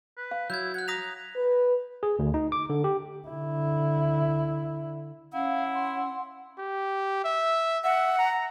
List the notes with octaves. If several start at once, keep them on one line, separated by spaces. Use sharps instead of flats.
B4
F5
F#3 E4 G6 G#6
F#5 F#6 G#6
A#5 D#6 B6 F7
B4
G#4
D2
D#4
D6
D3
G4
D3 E4
C#4 E4 F5 F#5
C6
G4
E5
E5 F#5
A#5